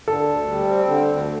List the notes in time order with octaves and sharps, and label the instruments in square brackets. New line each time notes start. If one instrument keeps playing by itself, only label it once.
[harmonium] D3 [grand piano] A4
[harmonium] D2
G3
C4
D3
D2